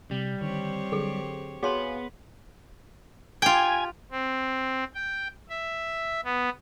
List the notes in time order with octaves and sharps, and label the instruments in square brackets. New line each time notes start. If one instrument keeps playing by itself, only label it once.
[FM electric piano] C3 [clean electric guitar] G3
[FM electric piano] D3 D#3 [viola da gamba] C4 G4 C#5
[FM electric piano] D3 F#3 [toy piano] G#4 A4
[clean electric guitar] B3 B4 [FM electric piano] F#4 F5 G#5 [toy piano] G#4 C#5 C6
[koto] F4 G5 [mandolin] G4 [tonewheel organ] G#5
[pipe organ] C4
G5
E5
B3